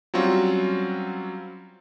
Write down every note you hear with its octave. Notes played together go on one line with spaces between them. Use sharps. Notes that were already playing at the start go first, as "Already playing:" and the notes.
F#3 G3 C4 C#4 F4 F#4